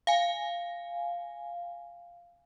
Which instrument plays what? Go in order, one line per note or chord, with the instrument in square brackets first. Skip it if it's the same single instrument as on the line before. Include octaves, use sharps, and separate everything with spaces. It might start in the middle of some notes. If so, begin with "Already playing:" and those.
[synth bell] F5 G#5